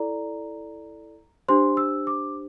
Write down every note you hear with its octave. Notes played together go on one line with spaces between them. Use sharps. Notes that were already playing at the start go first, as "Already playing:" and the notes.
Already playing: E4 A4 D5 A#5
D4 G4 C5 C6
E6
D6